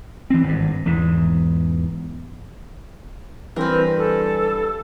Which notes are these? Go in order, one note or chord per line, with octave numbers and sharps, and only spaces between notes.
E3 C4
G#1 G2
E2 G#2 E3
G2 E3 C4 A#4 B4
A4